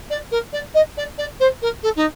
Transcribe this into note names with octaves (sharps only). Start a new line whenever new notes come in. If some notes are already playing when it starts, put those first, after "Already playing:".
D5
A#4
D5
D#5
D5
D5
C5
A#4
A4
D#4